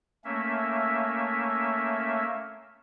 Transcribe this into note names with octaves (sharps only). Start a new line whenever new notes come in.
A3 A#3 C#4 E5